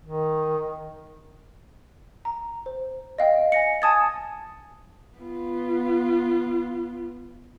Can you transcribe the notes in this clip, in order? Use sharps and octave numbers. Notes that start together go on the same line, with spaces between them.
D#3
A#5
C5
D#5 F5 G5
G#5 A#6 C#7
G#5 A5 D#6 G#6 A6
B3 F4